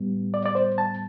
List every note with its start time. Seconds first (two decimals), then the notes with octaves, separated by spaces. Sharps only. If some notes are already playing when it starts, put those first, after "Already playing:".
Already playing: A2 G3 B3
0.34 D5
0.46 D5
0.55 C5
0.78 A5